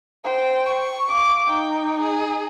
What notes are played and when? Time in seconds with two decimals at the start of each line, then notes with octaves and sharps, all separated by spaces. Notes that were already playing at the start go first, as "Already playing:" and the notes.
0.24 C5 G5
0.65 C#6
1.08 F5 D6
1.47 D#4 G5
1.99 G#4